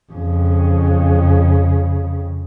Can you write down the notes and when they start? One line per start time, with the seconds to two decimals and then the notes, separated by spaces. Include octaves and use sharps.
0.13 F2 C#3